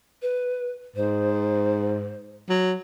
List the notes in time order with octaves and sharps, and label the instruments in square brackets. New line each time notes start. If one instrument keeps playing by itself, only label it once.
[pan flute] B4
[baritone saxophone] G#2 [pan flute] C5
[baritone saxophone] F#3